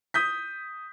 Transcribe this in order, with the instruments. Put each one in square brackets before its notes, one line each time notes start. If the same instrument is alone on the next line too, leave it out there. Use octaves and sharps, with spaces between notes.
[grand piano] D#6 G6 B6